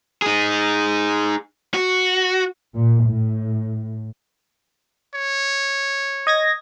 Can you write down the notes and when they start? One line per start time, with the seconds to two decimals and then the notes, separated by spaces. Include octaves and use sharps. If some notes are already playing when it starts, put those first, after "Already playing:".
0.22 D#4 G#4
1.74 F#4
2.75 A#2
3.07 A2
5.15 C#5
6.27 D#5 G#6 A#6